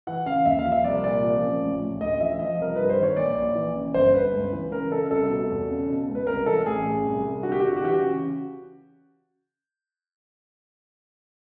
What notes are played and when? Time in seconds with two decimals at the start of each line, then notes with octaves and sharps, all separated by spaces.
0.07 E3 F#5
0.26 C#3 F5
0.45 D#2 E5
0.59 F5
0.65 F3
0.72 E5
0.84 C2 D5
1.04 A#2 D5
1.23 F3
1.43 C#3
1.62 A1
1.81 A1
2.00 D2 D#5
2.20 F3 E5
2.39 F3 D#5
2.59 C2 A#4
2.76 G2 B4
2.89 C5
2.98 D#3
3.03 C#5
3.17 A#1 D5
3.36 A#1
3.55 E3
3.75 C#3
3.94 G1 C5
4.14 G1 B4
4.34 C#2
4.53 E3
4.72 C#3 A#4
4.92 C#3 A4
5.11 C2 A4
5.30 B2
5.50 E2
5.69 C#3
5.89 B2
6.08 C#2
6.15 B4
6.27 C2 A#4
6.46 E3 A4
6.66 A1 G#4
6.85 A1
7.05 C2
7.24 C2
7.43 D3 F#4
7.52 G4
7.60 D3 F#4
7.68 G4
7.76 F#4
7.82 E3 G4
7.93 F#4
8.01 C#3